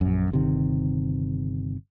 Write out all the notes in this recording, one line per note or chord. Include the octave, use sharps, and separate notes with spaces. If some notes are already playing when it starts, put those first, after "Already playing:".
A#1 F#2
G1 C3 D#3